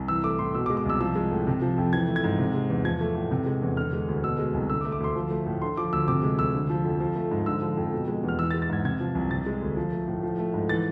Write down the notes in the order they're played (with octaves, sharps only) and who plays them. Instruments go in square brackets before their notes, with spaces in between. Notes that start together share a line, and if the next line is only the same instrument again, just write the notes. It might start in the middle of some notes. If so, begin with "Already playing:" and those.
Already playing: [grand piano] C2
E3 E6
A3 D6
A2 C6
B2 E6
D6
G#3
D6
C2 E6
F3 E6
G#3
A2
C3
F3
F2
E3 G#6
A3
G#6
G#2
C3
G#3
E2
F3 G#6
A3
A2
C3
G#3
E2
D3 F6
G#3
D2
B2 E6
G#3
C2
D3 E6
D6
A3
D6
D2 C6
F3
A3
A2
D3 C6
F3 D6
D2 E6
C3 D6
G#3
D2 E6
D3
F3
F2
F3
A3
G#2
D3 E6
F3
F2
B2
G#3
E2
F6
E3 E6
A6
G#3
A6
G#2 G#6
C3 G#6
F3
C2
C3 A6
G#3
D2
F3
A3
A2
F3
A3
G#2
E3 A6